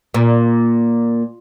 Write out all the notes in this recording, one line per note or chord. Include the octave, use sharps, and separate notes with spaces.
A#2